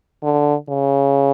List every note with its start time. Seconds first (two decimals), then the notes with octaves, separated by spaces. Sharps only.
0.23 D3
0.69 C#3